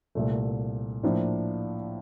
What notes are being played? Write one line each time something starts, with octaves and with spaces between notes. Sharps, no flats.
C2 A#2 A3
A2 F3 A#3 D4